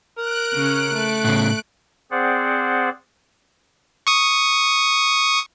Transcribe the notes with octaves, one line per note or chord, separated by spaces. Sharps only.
A#4 F#6 D7
C#3 C#4
A3
A2 C#3
C4 G#4 C5 D5 F#5
C#6 D#6